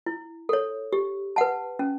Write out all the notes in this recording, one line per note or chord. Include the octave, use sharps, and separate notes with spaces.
E4
A4 C#5
G4
B4 F#5 A5
C#4